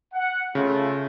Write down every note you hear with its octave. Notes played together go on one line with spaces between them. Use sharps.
F#5
C#3 A3 F4